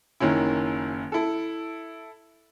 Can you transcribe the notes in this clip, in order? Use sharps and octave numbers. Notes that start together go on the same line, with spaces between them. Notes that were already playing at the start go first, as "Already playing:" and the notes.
F#1 D#3 C#4 E4
E4 A4